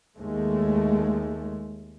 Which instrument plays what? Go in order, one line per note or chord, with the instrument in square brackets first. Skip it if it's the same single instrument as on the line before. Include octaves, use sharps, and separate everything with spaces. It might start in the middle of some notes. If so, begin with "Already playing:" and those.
[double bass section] D#2 G#3 A3